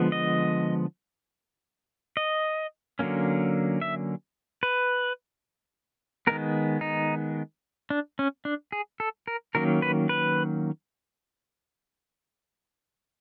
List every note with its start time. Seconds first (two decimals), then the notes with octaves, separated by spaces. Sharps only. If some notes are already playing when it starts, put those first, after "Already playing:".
Already playing: D3 F3 G#3 B3
0.12 D#5
2.17 D#5
2.99 D3 F#3 A#3 C#4
3.82 E5
4.63 B4
6.27 D#3 G#3 B3 A#4
6.81 D#4
7.90 D4
8.19 C#4
8.45 D4
8.72 G#4
9.00 A4
9.27 A#4
9.55 D#3 F#3 A#3 C#4 A#4
9.82 B4
10.09 B4